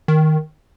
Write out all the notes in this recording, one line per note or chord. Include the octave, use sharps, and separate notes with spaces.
D#3